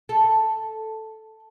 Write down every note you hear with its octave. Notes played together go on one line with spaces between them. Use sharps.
A4